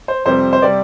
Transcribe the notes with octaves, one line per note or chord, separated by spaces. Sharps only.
C5
F2 C3 G3 C4 C5
C5
C3 G3 C4 D5